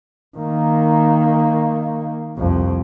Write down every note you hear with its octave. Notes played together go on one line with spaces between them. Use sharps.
D#3 A#3
C2 F2